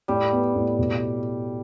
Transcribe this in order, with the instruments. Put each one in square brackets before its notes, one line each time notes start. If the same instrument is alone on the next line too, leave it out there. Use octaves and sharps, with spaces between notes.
[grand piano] A2 [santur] G3
[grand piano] B3
A2
B2